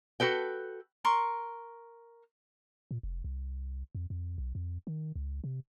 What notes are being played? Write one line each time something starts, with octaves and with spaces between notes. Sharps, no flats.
F#4 A4 B4 G5
A#4 C6 C#6
A#2
F1
C2
F2
F2
B1
F2
D#3
C#2
C3